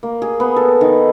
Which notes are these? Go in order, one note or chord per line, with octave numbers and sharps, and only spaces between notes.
A#3
G#4
B3
A4
D#3